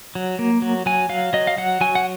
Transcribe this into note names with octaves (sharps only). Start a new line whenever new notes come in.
F#3
A#3
F#3
F#3 G#5
F#3 F5
F#3 D#5
F5
F#3 F#5
F#3 G#5
F#5